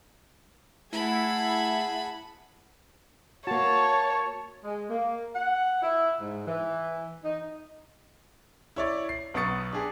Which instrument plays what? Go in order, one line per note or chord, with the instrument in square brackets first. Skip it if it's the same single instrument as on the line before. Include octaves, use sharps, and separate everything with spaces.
[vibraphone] A3 [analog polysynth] E4 [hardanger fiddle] G#4 F#5 [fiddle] A5 B5
[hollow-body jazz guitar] A#3 F#4 [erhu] C#5 [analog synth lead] A5
[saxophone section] G#3
A#3
F#5
E4
G#2
E3
D#4
[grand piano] E4 C#5 D5
C7
B1 B3 C#6 D#6 A6 C#7
D4 G4 G#4